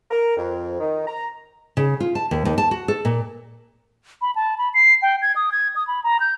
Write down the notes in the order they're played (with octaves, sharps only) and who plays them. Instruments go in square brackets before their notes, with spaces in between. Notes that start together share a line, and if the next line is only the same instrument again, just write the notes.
[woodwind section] A#4
F2
D#3
A#5
[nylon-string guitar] C#3
F4
A5
D#2
D#2
A5
F#4
A4
A#2
[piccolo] B5
A5
B5
C7
G5
G#6
D#6
G#6
D#6
B5
A#5
G6